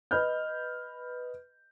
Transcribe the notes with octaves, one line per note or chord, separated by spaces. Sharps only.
B4 D#5 B5 F6 G6